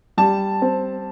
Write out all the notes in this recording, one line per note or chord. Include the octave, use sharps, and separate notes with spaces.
G3 A5
C4